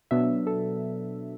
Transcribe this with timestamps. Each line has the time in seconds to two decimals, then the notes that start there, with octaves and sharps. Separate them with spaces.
0.11 B2 F#3 B3 D4 E5
0.47 A4